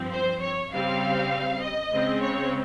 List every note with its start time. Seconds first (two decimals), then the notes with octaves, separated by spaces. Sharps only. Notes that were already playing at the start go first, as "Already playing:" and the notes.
Already playing: G2 F3 C4
0.13 C5
0.42 C#5
0.72 C#3 G3 C4 F5
1.62 D#5
1.92 C#3 G#3 C4
2.22 C#5